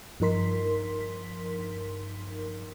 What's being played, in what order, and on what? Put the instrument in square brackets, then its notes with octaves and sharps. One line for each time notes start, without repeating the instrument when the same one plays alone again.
[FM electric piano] G2 F3 D#4 A#4 C6 B6